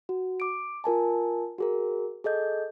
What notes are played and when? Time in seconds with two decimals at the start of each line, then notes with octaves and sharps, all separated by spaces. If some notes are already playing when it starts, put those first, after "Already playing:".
0.09 F#4
0.40 D6 D7
0.84 F4 A#4 G#5 A5
1.58 F#4 G#4 A#4
2.24 G#4 A4 D#5 G6